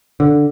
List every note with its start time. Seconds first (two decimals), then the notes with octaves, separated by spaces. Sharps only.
0.20 D3